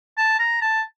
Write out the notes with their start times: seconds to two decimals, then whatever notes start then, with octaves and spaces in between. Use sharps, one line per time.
0.17 A5
0.39 A#5
0.61 A5